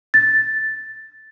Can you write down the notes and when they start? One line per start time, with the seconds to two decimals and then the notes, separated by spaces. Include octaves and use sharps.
0.14 A6